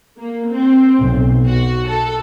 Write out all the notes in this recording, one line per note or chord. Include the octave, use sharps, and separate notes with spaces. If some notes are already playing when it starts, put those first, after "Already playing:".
A#3
C4
B1
F#4
A4